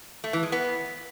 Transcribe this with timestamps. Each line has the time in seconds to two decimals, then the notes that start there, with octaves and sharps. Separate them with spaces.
0.24 A3
0.33 E3
0.43 G#3
0.52 B3